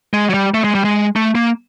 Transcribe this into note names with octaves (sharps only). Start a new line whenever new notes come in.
G#3
F#3
G3
A3
G#3
G3
G#3
A3
A#3